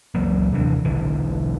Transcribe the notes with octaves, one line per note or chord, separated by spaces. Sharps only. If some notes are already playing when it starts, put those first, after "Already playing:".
C#2 E3 F#3 A#3
D#2 C3 E3 D4
B1 D3 E3